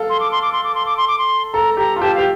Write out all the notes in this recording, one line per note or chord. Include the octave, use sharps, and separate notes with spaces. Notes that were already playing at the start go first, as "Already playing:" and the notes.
Already playing: A4 F5
C6
D6
C6
D6
C6
D6
C6
D6
C6
D6
C6
A4 A#5
G4 A#5
F4
G4 A5
G4 F5